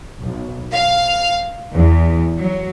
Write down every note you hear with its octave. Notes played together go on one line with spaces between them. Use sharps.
B1
F5
E2
F#3